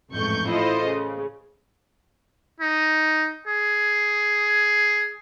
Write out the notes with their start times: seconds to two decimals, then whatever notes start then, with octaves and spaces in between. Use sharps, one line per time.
0.14 A1 F2 G#2 A3 C#6 G6
0.48 E4 F4 A4 C5 D#5
0.85 C#3
2.60 D#4
3.48 G#4